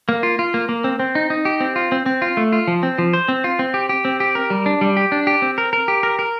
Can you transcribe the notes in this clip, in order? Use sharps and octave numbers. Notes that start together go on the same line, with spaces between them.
A#3
F4
F4
A#3
A#3
C4
C4
D#4
D#4
G4
C4
F4
C4
C4
F4
A3
F4
F3
C4
F3
C5
C4
F4
C4
G4
G4
C4
G4
A#4
G3
D4
G3
G4
D4
G4
C4
A#4
A#4
G4
A#4
A#4